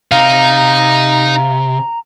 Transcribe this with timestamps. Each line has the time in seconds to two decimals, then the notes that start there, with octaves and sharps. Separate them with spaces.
0.12 C3 D#4 F5 A#5